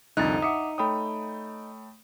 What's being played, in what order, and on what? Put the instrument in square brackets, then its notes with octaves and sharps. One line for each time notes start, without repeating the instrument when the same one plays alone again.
[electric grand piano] C2 F2 D3 [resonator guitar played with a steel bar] D#4 [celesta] F#6 A6
[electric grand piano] E5 C#7 [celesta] F#5 D6 D#6
[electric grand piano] A3 G5 D#6 [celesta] C#5 B5